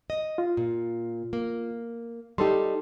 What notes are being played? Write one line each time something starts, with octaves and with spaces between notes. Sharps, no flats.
D#5
F4
A#2
A#3
G3 D#4 G4 A4 C6